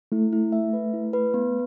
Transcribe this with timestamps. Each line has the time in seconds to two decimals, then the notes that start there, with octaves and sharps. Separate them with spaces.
0.12 A3 E4
0.33 E4
0.52 E5
0.73 B4
0.93 E4
1.13 B4
1.34 B3